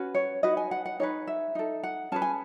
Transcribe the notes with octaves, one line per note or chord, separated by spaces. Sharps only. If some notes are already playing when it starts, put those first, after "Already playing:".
Already playing: C#4 F#4 B4
C#5
D#4 F#4 B4 D#5
G#5
F#5
F#5
D#4 G#4 B4 C#5
E5
D#4 A4
F#5
C#4 G#4 B4 A5
G#5